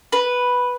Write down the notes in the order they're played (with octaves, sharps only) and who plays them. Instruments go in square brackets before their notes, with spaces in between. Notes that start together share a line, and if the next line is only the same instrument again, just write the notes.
[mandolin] B4